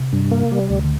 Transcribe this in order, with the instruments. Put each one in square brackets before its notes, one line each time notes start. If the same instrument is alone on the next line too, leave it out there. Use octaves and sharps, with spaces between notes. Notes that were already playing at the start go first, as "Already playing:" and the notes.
Already playing: [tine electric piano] C3
[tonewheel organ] G2
A#3
G3
D2
[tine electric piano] D3